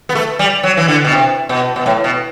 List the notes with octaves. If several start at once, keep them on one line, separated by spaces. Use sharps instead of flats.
B3
A3
G3
F#3
E3
D3
B2
C3
B2
B2
A2
B2